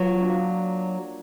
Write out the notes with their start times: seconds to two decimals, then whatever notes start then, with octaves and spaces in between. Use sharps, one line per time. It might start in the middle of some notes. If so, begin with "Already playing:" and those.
Already playing: F3 F#3 B3 F4
0.20 A#3 D4 F#4